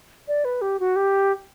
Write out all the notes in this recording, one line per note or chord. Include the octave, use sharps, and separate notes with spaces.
D5
B4
G4
F#4
G4